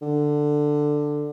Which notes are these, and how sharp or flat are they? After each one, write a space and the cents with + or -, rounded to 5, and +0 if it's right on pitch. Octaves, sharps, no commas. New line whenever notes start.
D3 +10